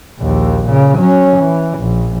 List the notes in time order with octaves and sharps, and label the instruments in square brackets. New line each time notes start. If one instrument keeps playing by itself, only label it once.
[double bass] A#1 D#2
A#2 C#3
F#3 C#4
E3
A#1